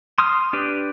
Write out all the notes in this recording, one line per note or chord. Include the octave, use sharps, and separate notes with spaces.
C6 D#6 F6
D4 G4 B4